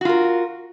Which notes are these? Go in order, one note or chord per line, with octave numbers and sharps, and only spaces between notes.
F4 F#4 A#4